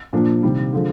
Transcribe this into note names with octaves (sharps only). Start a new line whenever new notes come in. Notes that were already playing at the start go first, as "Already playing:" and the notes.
A#2 F3 A#3 D4
C3 D#3 G3
D3 F3 G#3